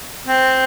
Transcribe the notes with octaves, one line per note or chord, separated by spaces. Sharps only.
C4